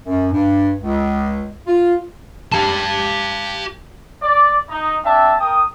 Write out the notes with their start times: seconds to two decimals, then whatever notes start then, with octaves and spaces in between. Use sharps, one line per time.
0.06 F#2
0.32 G2
0.82 C#2
1.67 F4
2.52 G4 A5
4.22 D5
4.69 D#4
5.05 C4 D4 E5 A5
5.40 A#4 G5 D#6